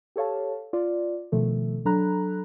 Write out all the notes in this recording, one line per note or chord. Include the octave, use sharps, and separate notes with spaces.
G4 A4 C#5 F5 A5
F4 D5
B2 D#3 F3 A3 A4
F#3 D4 A4 A#5 B5 F#6